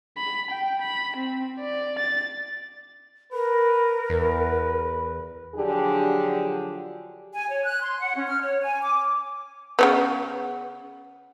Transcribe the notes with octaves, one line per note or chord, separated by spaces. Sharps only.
B5
G5
B5
C4
D5
A6
A#4 B4
E2 B4
D3 F3 F#3 D4 G4 G#4
G#5
C#5
F#6
C6
F#5
C#4
F6
C#5
G#5
D6
C#3 G#3 B3